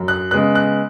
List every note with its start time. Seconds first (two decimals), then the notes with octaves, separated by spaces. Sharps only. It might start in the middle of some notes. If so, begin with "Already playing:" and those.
Already playing: F#2
0.08 F#6
0.31 C#3 G#3 B3 F#6
0.55 F#6